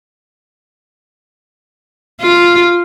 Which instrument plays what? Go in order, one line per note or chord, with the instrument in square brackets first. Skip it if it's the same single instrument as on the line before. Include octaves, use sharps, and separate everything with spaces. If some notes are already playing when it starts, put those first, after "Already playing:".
[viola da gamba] F4